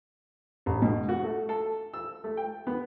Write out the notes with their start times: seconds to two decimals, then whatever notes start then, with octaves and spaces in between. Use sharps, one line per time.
0.66 A1
0.82 B2
1.09 F#4
1.24 A3
1.49 A4
1.94 E6
2.24 A3
2.37 G5
2.67 B3